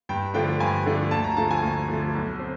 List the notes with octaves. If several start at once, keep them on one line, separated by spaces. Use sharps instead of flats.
G2 G5
D3 F3 A3 D4 G5
G2 G#5
D3 F3 A3 D4
D2 A5
A#5
D3 F3 A3 A5
G#5
D2
D3 F3 A3
B1
C4